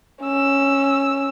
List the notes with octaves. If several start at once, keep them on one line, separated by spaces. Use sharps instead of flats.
C#4 E6